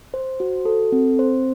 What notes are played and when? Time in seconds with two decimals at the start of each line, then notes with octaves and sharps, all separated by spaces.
0.14 C5
0.40 F#4
0.65 A4
0.92 C4
1.19 C5